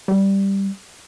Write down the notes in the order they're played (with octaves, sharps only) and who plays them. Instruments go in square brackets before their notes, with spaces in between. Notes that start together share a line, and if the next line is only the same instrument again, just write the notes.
[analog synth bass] G3